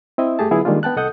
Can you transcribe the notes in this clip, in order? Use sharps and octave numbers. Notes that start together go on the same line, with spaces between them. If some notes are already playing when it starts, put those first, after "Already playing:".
C4 E4 D#5 E5
G2 A3 G4 G#4 A5
D3 F#3 B3 E4 F4 G#4
D#3 G3 G#3 A#3 D4 F4
B3 G5 A5 F#6
C2 A4 D#5 F#5 D#6 G6